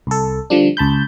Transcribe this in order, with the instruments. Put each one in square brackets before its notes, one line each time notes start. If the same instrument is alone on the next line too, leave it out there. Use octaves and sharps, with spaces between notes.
[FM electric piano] C2 A4
D3 F3 G3 D4
C#2 A5 B5 G6